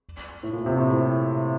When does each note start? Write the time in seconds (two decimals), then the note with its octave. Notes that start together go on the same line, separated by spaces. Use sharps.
0.43 A2
0.53 A#2
0.66 C3
0.77 A2